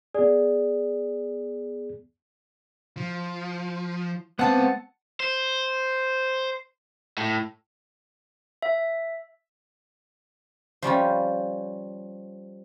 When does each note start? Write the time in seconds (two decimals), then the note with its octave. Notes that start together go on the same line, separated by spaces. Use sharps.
0.14 B3 G#4 D5
2.97 F3
4.39 G#3 B3 C4 F5 F#5 A5
5.20 C5
7.18 A2
8.62 E5
10.82 F3 G3 C#4 F4